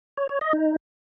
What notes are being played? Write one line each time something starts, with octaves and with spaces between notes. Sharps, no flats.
C#5
C#5
D#5
D#4